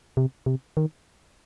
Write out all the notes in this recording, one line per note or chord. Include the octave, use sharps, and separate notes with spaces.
C3
C3
D#3